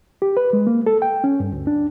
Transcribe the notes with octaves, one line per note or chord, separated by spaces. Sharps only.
G4
B4
G#3
A#3
A4
G5
C#4
G2
D2
D4